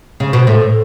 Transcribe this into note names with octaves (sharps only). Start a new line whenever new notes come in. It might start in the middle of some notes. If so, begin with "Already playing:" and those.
C#3
B2
A2